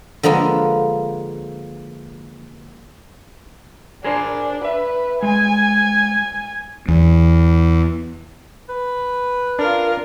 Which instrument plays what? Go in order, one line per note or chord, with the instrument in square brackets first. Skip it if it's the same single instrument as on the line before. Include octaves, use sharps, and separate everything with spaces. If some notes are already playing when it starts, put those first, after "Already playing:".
[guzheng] D3 F3 G#3 A#3 B3
[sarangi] D4 [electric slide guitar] G#4 A#4 C5
[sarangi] B4 [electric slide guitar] E5
[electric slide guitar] G#3 [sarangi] G#5
[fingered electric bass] E2
[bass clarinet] B4
[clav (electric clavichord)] D4 [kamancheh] F4 A#4